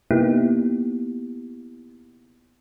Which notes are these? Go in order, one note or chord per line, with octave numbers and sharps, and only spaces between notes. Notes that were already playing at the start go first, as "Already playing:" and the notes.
C3 A#3 B3 D#4 E4 G4